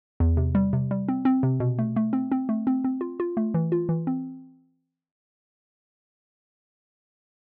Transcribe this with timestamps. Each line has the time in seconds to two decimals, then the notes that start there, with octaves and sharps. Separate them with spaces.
0.20 E2
0.37 C3
0.55 G3
0.73 C3
0.91 G3
1.08 C4
1.25 C4
1.43 C3
1.60 B2
1.79 A3
1.96 A3
2.13 C4
2.32 C4
2.49 A3
2.67 C4
2.84 C4
3.01 F4
3.20 F4
3.37 A3
3.54 E3
3.72 F4
3.89 E3
4.07 C4